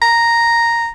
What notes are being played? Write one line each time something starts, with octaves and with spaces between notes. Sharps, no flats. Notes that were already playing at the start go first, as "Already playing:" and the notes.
A#5